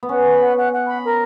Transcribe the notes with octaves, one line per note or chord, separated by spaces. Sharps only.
B3
C#4 F#5
B4
F#5
F#5
F#5
B5
A#4